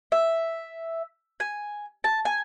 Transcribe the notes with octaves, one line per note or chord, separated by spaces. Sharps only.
E5
G#5
A5
G#5